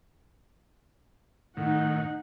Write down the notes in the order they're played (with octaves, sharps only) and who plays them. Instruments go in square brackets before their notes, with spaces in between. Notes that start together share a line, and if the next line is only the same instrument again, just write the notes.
[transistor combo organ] A2 D#3 [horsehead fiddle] D#4 F#5